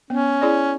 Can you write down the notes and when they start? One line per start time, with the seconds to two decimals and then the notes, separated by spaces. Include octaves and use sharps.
0.10 B3 C#4
0.42 E4 G#4 D5